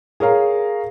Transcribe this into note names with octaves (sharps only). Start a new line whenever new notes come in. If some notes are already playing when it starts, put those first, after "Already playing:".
G#4 A#4 C#5 F5 A#5